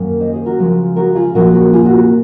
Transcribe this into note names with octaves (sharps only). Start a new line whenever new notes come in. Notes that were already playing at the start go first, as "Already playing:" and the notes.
Already playing: F#2 D#3 A#3 C#4
C5 D#5
G#4 C5
F#4 A#4
C#3 F3 G#3 C#4
F#4 A#4
F4 G#4
A#2 F3 A#3 C#4 F#4 A#4
F#4
F4 G#4
F#4
F#4